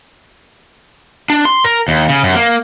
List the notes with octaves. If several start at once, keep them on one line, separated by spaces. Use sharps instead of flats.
D4
C6
A#4
D#2
C#3
F#2
A#3